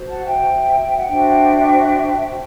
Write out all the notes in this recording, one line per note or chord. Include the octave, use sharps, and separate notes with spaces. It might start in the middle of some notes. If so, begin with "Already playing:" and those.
Already playing: F#4 C5
F#5 A5
E5 G5
F#5
D4 F#4 C5 E5 G5